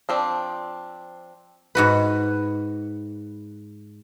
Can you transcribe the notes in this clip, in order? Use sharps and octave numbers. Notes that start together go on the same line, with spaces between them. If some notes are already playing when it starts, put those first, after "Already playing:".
F3 C4 D4
G#2 F#4 B4